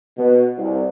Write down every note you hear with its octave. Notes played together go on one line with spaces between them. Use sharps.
B2
C2